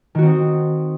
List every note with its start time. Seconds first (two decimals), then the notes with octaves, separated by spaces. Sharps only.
0.15 D#3
0.18 F#4
0.22 C4
0.26 D#4